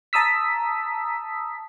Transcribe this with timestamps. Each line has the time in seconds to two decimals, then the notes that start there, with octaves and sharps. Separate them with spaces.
0.13 A5 A#5 D#6 E6 B6